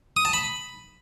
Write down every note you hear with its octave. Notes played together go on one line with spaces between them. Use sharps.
D#6
A5
B5